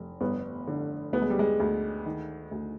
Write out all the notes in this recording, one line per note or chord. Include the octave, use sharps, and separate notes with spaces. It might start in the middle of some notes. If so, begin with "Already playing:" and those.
Already playing: F1
G1 B3
D3
D2 B3
G#3
G3
G#3
D2
D#3
D2